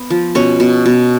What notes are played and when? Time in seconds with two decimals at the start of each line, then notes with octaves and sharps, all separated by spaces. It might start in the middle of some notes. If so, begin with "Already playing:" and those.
Already playing: B3
0.10 F3
0.35 B2 C#4 C#5
0.60 B2
0.86 B2